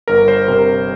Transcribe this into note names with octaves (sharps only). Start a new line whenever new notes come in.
G1 A#4
C5
C3 A#4